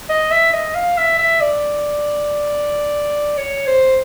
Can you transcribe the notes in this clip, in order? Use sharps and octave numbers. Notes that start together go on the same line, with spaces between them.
D#5
E5
D#5
F5
E5
E5
D5
C#5
C5